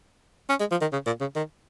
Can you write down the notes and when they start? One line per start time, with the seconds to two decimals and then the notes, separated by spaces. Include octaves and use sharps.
0.50 C#4
0.60 G#3
0.71 F3
0.81 D#3
0.93 C#3
1.06 A#2
1.21 C#3
1.36 D#3